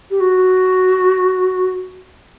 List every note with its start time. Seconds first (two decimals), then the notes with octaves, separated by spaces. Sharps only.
0.11 G4
0.20 F#4